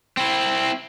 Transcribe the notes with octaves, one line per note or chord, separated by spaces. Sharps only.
C4 E4